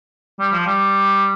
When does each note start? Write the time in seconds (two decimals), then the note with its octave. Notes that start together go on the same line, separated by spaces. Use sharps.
0.40 G3
0.53 F3
0.66 G3